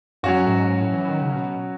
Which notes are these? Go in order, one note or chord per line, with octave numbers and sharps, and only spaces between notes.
F#2 F#3 C#4 F#4
A2
G#2
A2
E3
D#3
C#3
B2